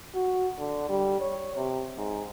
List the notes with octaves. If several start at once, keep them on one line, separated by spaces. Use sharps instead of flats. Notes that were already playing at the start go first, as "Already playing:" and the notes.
F#4
D3
G3
C#5
C3
G#2